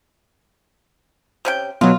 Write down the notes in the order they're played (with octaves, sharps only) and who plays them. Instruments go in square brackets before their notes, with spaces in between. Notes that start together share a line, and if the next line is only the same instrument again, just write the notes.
[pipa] C3 C#4 G5
[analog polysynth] B2 F#3 [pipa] F4